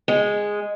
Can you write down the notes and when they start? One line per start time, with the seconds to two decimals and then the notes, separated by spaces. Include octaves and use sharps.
0.08 G#3